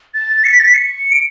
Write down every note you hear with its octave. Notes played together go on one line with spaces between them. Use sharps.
A6
C#7
B6
A6
B6
C#7
D7